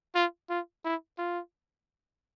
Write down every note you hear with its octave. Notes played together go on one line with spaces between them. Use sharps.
F4
F4
E4
F4